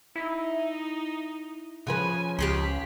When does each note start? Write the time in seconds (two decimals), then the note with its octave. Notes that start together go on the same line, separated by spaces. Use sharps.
0.16 D#4 E4
1.87 C#3 F3 B4 G#5
2.39 C#2 G4 G#4 C6 B6